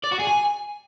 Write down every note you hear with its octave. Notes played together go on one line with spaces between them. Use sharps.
D5
F#4
G#4
G#5